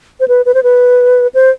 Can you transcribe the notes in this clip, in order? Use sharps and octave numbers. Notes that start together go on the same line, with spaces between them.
C5
B4
B4
C5
B4
C5